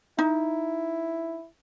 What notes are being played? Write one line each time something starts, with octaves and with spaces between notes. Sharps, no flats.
D#4 E4